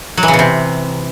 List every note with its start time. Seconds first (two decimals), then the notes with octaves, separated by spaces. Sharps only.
0.17 F#3
0.23 E3
0.28 C#3
0.34 B2
0.39 C3